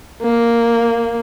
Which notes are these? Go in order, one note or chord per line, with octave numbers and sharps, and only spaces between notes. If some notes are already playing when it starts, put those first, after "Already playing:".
A#3